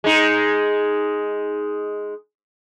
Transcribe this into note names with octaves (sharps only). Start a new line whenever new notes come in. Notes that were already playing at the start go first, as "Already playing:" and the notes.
G#3 D#4